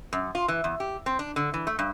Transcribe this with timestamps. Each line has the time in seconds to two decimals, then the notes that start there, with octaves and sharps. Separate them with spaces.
0.13 F#2
0.35 F4
0.48 E3
0.64 E2
0.80 G4
1.06 C4
1.19 D4
1.36 D3
1.54 E3
1.67 A3
1.79 G2